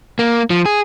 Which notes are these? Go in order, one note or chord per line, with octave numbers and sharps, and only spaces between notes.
A#3
F3
G#4